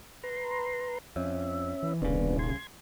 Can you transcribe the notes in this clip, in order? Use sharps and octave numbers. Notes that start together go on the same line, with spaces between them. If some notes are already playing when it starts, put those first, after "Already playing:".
B4 A#5 C6
F2 C#4 E5
E3
D#1 C2 C#3 B3 D4
C6 G#6